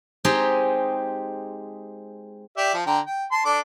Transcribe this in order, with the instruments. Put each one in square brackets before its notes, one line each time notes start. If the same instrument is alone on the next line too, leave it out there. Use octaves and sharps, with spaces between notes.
[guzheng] G#3 C4 D#4 G4 G#4
[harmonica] G4 D5 E5
F3
D3 G5 A#5
G5
A5 C6
D4 A4 D6